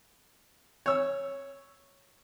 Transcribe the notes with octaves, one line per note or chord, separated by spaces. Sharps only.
C#5 E6